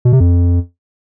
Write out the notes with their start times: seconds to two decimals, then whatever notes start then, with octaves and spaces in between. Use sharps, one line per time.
0.05 B2
0.13 C3
0.20 F2